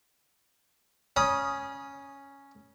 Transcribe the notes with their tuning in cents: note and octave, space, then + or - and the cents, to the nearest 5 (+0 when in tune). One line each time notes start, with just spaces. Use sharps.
C#4 +0 B5 -40 D#6 +0